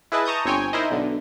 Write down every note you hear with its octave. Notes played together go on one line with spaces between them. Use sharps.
E4 G#4 B4 D#5 A5
A5 A#5 C#6 D#6 G6
G1 C4 C#5 G5 G#5
D#4 E4 A#4 C5 D#5
B1 D3